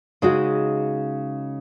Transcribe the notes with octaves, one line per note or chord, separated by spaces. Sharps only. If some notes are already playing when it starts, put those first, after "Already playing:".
C#3 G#3 D#4 F#4